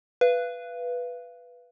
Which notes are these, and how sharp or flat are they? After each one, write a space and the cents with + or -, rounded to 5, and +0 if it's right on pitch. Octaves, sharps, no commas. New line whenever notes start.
B4 +0 F5 -30